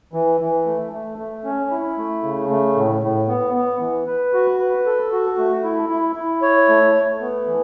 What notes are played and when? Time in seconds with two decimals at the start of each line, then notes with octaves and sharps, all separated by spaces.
0.13 E3
0.40 E3
0.66 A3
0.93 A3
1.18 A3
1.44 C#4
1.71 E4
1.98 A3
2.23 C#3
2.49 A3
2.76 A2
3.02 A2
3.28 B3
3.54 B3
3.80 E3
4.07 B4
4.33 F#4
4.59 B4
4.86 A4
5.12 F#4
5.38 A3
5.64 E4
5.89 E4
6.16 E4
6.42 C#5
6.69 A3
6.95 A3
7.21 B3
7.47 E3